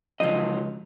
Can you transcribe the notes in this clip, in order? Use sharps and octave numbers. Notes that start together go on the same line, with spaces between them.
C#2 D3 F3 F#3 D#5